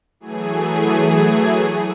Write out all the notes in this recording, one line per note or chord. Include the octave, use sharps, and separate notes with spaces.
E3 F#3 A3 G#4 G#5